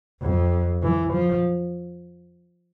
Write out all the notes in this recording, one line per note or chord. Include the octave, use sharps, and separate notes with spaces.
F2
E3
F3